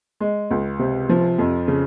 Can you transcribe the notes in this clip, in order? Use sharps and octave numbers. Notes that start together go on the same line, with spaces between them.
G#3
C#2
C3
F3
F2
C#3